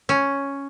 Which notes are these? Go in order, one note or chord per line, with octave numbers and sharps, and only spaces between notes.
C#4